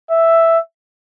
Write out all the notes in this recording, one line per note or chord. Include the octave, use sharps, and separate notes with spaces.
E5